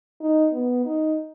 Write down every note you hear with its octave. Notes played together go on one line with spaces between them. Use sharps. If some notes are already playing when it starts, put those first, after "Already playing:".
D#4
B3
D#4